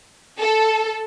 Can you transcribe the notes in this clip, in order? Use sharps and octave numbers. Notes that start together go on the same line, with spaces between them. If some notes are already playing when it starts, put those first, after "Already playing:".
A4